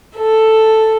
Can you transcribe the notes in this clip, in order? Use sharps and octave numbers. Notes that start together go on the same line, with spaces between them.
A4